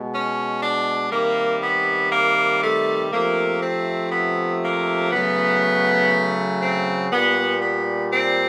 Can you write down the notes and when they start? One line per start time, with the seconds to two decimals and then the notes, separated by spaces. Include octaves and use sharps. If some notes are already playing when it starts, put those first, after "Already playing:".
Already playing: B2 G#3
0.12 C#4
0.61 D4
1.11 C3 D#3 G3 A#3
1.62 B3
2.12 A#3
2.61 A3
3.12 C3 F3 A3 A#3
3.62 C4
4.11 B3
4.62 A#3
5.11 C#3 F#3 A3 B3
6.61 C4
7.12 A#2 G3 B3
7.61 B3
8.11 C4